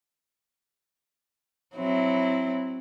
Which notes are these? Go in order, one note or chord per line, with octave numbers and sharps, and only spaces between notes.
F#3 C4 E4